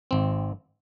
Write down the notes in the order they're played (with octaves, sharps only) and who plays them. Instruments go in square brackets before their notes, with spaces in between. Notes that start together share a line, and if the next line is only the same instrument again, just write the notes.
[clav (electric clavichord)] G#1 C4